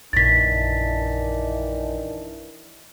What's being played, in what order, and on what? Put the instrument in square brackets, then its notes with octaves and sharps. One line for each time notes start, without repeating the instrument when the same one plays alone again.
[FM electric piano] A#1 F#2 A#2 [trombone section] D#3 E3 D4 [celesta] A6 B6